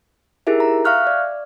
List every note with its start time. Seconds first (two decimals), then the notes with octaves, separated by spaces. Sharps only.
0.47 D#4 E4 G4 G#4 A#4 E5
0.60 A#5
0.85 E5 F5 C#6 F6 F#6
1.07 D5